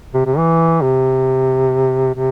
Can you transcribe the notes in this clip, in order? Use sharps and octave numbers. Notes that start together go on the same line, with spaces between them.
C3
C3
E3
C3
C3